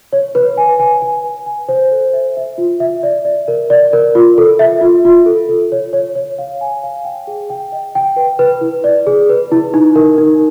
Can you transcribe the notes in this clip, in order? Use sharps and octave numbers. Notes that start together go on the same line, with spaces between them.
C#5
B4
G#5
G#5
G#5
B4
G#5
C5
A4
E5
E5
F4
E5
D5
D5
A#4
D5
A#4
F4
A4
E5
F4
F4
A4
A4
C#5
C#5
C#5
F5
G#5
F5
G5
G#4
G5
D#5
G5
B4
B4
E4
D5
G#4
B4
E4
D#4
A#4
D#4